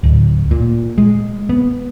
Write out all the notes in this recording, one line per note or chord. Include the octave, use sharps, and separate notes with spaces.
D1
A#2
G#3
B3